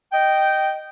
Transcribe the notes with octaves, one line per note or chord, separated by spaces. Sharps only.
D#5 G5